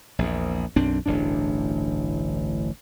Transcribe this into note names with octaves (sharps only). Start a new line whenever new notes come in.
A#1 E2
B1 F#2 C4 D4
D1 A1 G2 D4